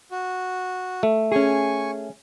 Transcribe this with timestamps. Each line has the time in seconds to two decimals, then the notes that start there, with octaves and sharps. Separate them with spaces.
0.11 F#4
1.03 A3
1.32 C#4 G#4 G#5 C#6